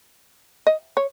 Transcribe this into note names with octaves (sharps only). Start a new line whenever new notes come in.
D#5
C#5